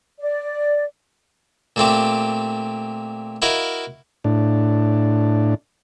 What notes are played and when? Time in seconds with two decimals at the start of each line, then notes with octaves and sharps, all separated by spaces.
0.20 D5
1.76 A#2 A3 C4 G4
3.42 E4 F#4 A#4 D#5 F5
4.24 A2 D4